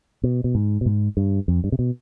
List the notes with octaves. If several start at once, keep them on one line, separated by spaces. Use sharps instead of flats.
B2
B2
G#2
B2
G#2
G2
F2
G2
C3
B2